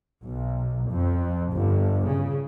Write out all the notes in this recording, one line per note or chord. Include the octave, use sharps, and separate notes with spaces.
B1
F2
G1
C#3